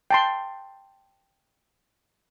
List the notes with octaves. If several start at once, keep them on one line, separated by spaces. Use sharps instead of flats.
G5 A5 C6